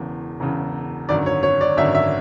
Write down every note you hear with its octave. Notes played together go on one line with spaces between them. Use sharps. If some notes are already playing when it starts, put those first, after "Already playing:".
Already playing: E1 E2 C#3
E1 E2 C#3
G#1 F#2 D3 D5
C#5
C#5
D5
G#1 F#2 D3 E5
E5